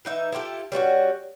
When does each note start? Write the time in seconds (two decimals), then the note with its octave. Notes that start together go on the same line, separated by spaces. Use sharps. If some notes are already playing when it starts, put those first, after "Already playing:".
0.05 E3 D#4 E5
0.32 E4 F4 G4 A4
0.72 G3 C#4 F4 F#4